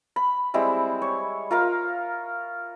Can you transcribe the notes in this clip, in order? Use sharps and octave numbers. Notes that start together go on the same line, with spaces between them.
B5
G3 G#3 C4 E4
C#5
F4 A#4 F5